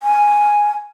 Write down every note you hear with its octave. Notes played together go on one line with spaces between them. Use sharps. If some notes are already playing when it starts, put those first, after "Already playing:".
G#5